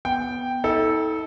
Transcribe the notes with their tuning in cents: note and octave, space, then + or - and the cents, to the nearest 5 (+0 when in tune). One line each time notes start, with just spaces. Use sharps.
B3 +0 G5 +0
D#4 +45 A4 -5